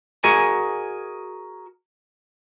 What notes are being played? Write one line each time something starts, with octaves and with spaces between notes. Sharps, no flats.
F#4 G#4 A#4 D#5 G#5